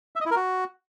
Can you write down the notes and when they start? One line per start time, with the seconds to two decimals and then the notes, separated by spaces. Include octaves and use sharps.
0.16 E5
0.21 D#5
0.26 E4
0.31 A#4
0.36 F#4